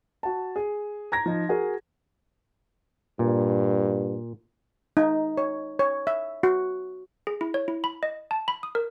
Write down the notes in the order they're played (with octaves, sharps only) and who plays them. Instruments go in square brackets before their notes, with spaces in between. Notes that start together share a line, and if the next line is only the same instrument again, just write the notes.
[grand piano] F#4 A5
G#4
A#5 G#6 A#6
F3 D#4
F#4 G#4 A#4
[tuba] G2 [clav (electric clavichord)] A#2
[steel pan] D#4
C#5
C#5
E5
F#4
[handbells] G#4
E4
C#5
E4
B5
D#5
A5
B5
D#6
A#4